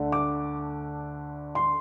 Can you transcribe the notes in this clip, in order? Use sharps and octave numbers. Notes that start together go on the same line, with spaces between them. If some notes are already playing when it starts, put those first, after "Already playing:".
Already playing: D2 D3 A3 D4
D6
C6